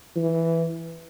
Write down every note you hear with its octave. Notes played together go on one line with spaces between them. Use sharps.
E3